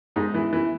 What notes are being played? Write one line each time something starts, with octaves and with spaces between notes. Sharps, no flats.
G#2 D#4
E3
E3